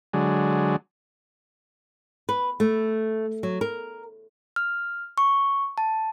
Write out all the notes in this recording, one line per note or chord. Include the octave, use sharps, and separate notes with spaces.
D3 F#3 G#3
B4
A3
F#3
A#4
F6
C#6
A5